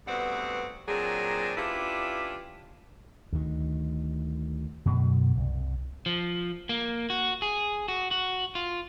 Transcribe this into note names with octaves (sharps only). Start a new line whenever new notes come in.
D2 G2 B3 C4 D4 F#5
A#2 F#3 C4 D4 G#4
C#4 D4 E4 F4 G4 B4
D2 D#3
F#2 B2 D3 F#3
C2
F3
A#3
F#4
G#4
F#4
F#4
F4